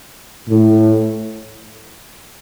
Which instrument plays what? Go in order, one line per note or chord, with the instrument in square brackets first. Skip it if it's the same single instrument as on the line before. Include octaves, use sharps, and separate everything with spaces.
[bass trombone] A2